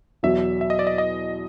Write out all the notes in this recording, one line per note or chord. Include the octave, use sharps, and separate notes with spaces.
E2 B2 F#3 E5
E5
D#5
D5
D#5
D#5